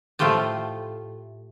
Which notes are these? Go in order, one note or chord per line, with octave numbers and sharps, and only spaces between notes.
A2 F3 A3 F4 G4 A5